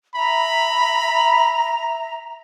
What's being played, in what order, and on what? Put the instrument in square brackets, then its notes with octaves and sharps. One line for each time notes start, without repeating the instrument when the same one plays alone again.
[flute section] E5 A#5 [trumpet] B5